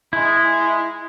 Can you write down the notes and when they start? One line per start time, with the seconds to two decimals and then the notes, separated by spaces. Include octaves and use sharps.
0.13 G#3 E4